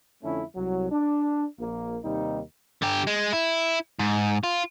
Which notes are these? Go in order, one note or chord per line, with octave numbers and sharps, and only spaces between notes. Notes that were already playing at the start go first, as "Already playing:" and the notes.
F2 D3 A3 C#4 E4
C2 F#3
D4
A#1 A#3
D#2 C3 G3 D#4
D3 G4
G#3
E4
G#2
F4